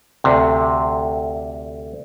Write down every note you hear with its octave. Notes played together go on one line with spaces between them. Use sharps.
D2 C3